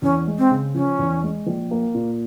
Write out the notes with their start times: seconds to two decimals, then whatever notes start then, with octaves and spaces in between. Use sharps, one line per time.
0.02 E2 C#4
0.27 G#3
0.38 C4
0.51 C#3
0.75 F3 C#4
0.99 E2
1.23 G#3
1.47 A#1
1.71 A#3
1.95 A#2